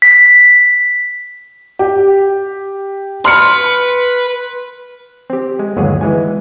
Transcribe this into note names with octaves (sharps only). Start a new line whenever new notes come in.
B6
G4
B4 C6 F6 C#7
C4 G4
G#3
G1 D#2 F#3 G#3 G#4
E3 G#3 G#5